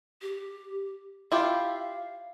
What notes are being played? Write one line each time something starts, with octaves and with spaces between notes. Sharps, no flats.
G4
E4 F4 G4 F5